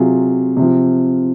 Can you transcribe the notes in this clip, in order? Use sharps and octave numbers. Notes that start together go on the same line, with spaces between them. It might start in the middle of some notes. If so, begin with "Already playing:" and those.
Already playing: C3 F#3 F4 G#4
C3
F3